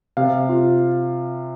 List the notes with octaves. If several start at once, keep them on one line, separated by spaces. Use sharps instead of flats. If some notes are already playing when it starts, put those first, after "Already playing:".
C3 F5
F4